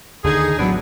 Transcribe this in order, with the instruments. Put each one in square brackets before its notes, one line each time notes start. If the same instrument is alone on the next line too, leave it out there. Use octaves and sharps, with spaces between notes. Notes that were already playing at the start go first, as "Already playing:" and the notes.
[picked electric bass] D#2 D3 [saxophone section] D#4 G#4
[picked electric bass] A1 F#3 [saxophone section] B3 D4